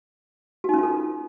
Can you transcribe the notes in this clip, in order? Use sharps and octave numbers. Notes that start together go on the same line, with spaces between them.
C#4 D#4 F4 F#4 A4